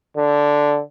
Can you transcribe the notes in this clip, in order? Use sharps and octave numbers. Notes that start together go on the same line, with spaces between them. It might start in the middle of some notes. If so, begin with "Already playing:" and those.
D3